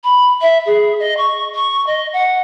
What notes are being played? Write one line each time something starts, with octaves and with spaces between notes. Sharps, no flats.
B5
E5
G#4
D#5
C#6
C#6
D#5
F#5